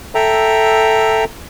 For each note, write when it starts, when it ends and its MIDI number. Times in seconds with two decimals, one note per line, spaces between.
0.15 1.24 69
0.15 1.24 76
0.15 1.24 79
0.15 1.24 82